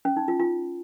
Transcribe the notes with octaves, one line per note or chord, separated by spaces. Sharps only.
C#4
D#4
F4
F4